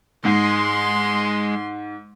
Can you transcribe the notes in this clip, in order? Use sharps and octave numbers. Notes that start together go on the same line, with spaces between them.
G#2 G#3 C6